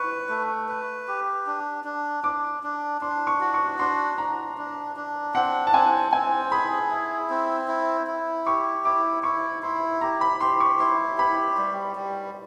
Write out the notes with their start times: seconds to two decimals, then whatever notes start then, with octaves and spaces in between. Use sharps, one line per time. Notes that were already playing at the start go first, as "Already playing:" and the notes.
Already playing: B4 C#6
0.29 A3
0.69 B4
1.08 G4
1.47 D4
1.84 D4
2.24 D4 D6
2.63 D4
3.01 D4 C6
3.27 C#6
3.41 F#4
3.54 C#6
3.79 D4 C6
4.18 D4 A#5
4.58 D4
4.97 D4
5.34 C4 F#5
5.67 A5
5.74 C4 G#5
6.12 C4 G#5
6.51 G#4 B5
6.91 E4
7.30 C4
7.68 E4
8.07 E4
8.46 G4 C#6
8.84 E4 D6
9.23 E4 C#6
9.63 E4 C6
10.01 G4 A#5
10.21 B5
10.41 G4 C6
10.60 C#6
10.80 E4 C6
11.18 G4 B5
11.58 G3
11.96 G3